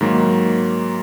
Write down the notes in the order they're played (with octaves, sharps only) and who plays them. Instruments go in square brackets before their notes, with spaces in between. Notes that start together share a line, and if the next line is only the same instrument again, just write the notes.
[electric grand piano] G#2 D#3 F#3 A#3